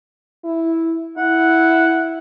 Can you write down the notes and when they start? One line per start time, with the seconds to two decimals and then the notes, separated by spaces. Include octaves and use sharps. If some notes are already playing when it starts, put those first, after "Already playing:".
0.45 E4
1.18 E4 F#5